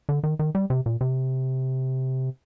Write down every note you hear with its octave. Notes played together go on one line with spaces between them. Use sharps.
D3
D#3
D#3
G3
C3
A#2
C3